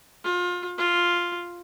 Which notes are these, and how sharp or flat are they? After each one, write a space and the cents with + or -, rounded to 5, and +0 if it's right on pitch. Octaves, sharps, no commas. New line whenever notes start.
F4 +30
F4 +0